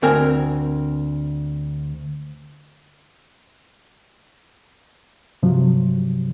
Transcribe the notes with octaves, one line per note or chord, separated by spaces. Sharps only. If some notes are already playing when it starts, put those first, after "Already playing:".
D2 C4 A#4 G#5
G2 C3 F3 F#3